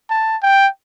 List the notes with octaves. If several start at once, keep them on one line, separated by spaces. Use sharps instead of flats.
A5
G5